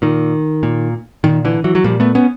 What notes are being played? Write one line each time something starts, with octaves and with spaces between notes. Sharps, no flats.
A#2 D#3
A#2
A#2 D#3
D3 E3
E3 F#3
F#3
A#2 F3 G3
A3 B3
B3 C#4